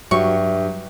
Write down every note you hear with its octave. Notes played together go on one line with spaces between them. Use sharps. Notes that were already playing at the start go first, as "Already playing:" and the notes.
G2 F#3 E5 G5 C#6